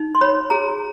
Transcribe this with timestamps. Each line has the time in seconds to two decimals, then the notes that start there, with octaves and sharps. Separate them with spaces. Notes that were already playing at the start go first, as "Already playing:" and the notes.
Already playing: D#4
0.15 C6
0.21 C#5 B5
0.50 G#4 A#5